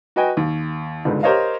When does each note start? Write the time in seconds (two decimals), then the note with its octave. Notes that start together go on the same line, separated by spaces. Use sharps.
0.16 F#4 B4 D#5 G5 G#5
0.37 D#2
1.05 G1 C#2 G#2
1.23 G4 A#4 C5 C#5 D#5 F5